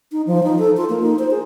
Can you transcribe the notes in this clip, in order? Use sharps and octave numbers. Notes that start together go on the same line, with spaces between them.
D#4
F3
D#4
A4
F4
A#3
D#4
C5
G#4